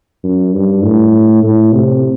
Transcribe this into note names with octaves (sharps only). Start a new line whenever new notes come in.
F#2
G2
A2
A2
C3